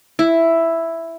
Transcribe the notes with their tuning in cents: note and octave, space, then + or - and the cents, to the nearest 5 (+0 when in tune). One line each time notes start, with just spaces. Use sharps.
E4 +5